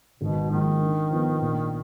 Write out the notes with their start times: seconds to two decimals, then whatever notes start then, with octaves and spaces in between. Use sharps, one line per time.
0.20 G#1 B2
0.50 G#2 D#3 F3 A#3
0.81 D3
1.11 F3 B3
1.41 A#1